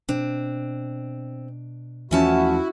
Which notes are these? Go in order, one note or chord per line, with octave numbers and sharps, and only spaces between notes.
B2 C4 D4
E2 E3 F3 A3 C#4 E4 F#4 A5